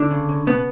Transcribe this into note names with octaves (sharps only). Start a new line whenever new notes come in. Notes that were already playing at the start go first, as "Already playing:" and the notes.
Already playing: D3 D4
C#3
C#3
B2 B3